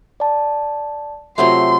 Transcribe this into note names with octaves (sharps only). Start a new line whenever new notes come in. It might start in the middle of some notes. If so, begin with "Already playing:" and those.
D5 A5
C3 F#3 A3 F4 A4 C6